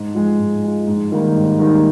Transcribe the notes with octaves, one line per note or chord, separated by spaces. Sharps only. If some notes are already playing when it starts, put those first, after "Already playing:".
Already playing: G#2
F3 G#3
G#2
F3 G#3
G#2
D#3 G3 A#3 D#4
G#2
D#3 G3 A#3 D#4